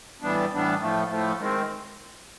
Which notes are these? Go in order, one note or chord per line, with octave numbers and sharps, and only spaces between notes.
A2 E3 G3 B3 D4
A2 E3 G3 B3 D4
A2 F3 A3
A2 F3 A3
D#3 G#3 C4